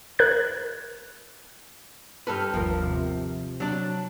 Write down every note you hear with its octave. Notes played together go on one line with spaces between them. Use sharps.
A#4 F#6 G#6
G2 A4 B4 F6 G6
G1 D#2 F3 A#4
C3
F#3 D4